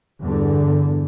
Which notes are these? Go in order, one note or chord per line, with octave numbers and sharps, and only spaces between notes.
E2 G2 D3